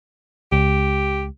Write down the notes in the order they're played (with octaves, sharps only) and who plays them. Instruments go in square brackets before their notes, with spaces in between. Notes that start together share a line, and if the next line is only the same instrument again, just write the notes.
[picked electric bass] C#2 [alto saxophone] G4